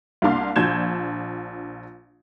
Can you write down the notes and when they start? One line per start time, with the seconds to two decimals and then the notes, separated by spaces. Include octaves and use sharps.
0.22 C2 A#3 D4 F5 C6
0.56 A#1 A#2 D4 G6 G#6 E7